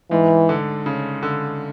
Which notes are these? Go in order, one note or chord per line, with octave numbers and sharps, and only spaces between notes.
G#2 E3
D3
C#3
D3